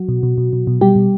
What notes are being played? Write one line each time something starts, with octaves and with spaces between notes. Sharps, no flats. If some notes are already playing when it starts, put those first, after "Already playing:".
Already playing: F#3 F#4
B2
B2
B2
B2
B2
B2 G3 G4
B2